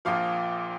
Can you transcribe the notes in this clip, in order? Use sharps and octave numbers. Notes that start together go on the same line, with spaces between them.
A#1 A#2 F3 F5